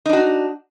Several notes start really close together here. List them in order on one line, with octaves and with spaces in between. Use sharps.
D#4 D4 F#4